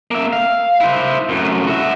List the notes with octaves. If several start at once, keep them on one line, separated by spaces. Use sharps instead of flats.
A#3 E5
F5
E4 C5
F#2 A2
F#4 E5